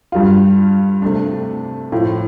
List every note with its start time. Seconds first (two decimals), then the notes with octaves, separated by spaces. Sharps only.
0.12 G2 G3 F4
1.02 C3 A3 D4
1.92 A2 F3 A3 F4